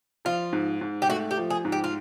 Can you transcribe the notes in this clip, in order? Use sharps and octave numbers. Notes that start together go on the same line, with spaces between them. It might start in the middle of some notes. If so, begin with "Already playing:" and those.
F3 F4
G#2
G#2
G4
A3 F#4
G4
F3
G#4
G#2
G4
F4